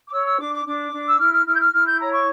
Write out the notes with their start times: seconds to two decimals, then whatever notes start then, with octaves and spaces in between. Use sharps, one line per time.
0.08 D6
0.12 C#5 E6
0.25 E6
0.38 D4 D6
0.52 D6
0.65 D4 D6
0.91 D4
1.07 E6
1.19 E4 F6
1.32 F6
1.46 E4 F6
1.53 G6
1.59 F6
1.72 E4 F6
1.86 G6
1.99 C#5 A#5
2.12 C#6